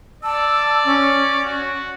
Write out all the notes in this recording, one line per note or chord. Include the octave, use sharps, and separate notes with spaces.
D5 A5 E6
C#4
F#4